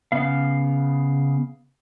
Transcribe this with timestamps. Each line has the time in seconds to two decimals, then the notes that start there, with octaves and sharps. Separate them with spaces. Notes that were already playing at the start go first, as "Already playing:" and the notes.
0.12 C#3 B3 F5